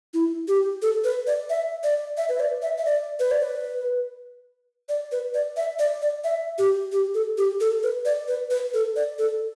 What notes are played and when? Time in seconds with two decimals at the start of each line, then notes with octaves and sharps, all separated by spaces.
0.14 E4
0.48 G4
0.82 A4
1.04 B4
1.27 D5
1.50 E5
1.83 D5
2.17 E5
2.29 B4
2.40 D5
2.62 E5
2.78 E5
2.85 D5
3.20 B4
3.31 D5
3.44 B4
4.89 D5
5.12 B4
5.34 D5
5.57 E5
5.79 D5
6.02 D5
6.24 E5
6.58 G4
6.92 G4
7.14 A4
7.38 G4
7.61 A4
7.83 B4
8.05 D5
8.28 B4
8.51 B4
8.74 A4
8.96 D5
9.19 A4